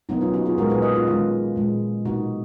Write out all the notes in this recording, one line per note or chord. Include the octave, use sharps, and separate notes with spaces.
B2 F#3 A#3 B3 D#4
C#4 F4
D#4 F#4
F4 G#4
A#2 G#3 F#4 A#4
G#4 B4
B4 D#5
C#4 F4
D#3 G#3 C#4 F4
A#2 G#3
B2 A#3 D#4 F#4